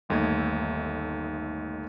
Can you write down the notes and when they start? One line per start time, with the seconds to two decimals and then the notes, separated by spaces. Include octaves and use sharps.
0.09 G1 D#2 A3 D#4 G#6